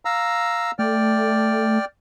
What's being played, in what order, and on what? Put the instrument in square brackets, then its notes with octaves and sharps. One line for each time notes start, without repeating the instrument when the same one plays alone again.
[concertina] F5 A#5 E6
[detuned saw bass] A3 [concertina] D5 G5 F6